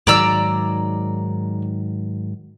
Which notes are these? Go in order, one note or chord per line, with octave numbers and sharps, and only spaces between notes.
G#2 D#3 F#3 D5 A#5 E6